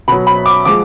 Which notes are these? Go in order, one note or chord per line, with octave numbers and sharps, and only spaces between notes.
B2 F#3 B5
B5
D6
F3 G#3 D6